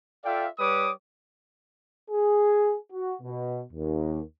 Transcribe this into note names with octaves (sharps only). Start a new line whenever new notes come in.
F4 A4 D5 E5 F5 G5
G3 B4 C#5 D6 D#6
G#4
F#4
B2
D#2